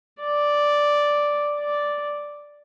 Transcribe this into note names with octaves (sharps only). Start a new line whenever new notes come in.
D5
D5